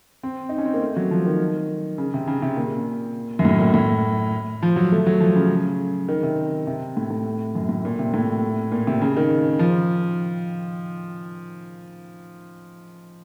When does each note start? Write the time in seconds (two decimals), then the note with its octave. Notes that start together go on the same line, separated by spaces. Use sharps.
0.23 C4
0.49 D#4
0.58 C#4
0.66 C4
0.74 A#3
0.82 A3
0.96 F#3
1.11 F3
1.26 D#3
1.98 C#3
2.14 C3
2.27 C#3
2.42 C3
2.57 A#2
3.39 F#2
3.45 A2
3.59 A#2
3.74 A2
4.63 F3
4.76 F#3
4.92 A3
5.06 F#3
5.21 F3
5.36 C#3
6.08 D#3
6.23 C3
6.67 C3
6.97 A2
7.10 A2
7.55 F#2
7.69 A2
7.85 A#2
7.99 C3
8.14 A2
8.72 A#2
8.87 C3
9.02 C#3
9.17 D#3
9.59 F3